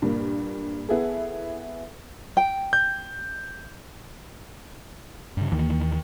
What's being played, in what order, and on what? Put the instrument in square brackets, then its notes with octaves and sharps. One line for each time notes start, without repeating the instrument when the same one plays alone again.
[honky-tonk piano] G2 A#2 A#3
B3 E4 G#4 A4
[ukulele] G5
[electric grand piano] G6
[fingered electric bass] G2 C#3
[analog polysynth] D#2 [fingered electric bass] D#3 E3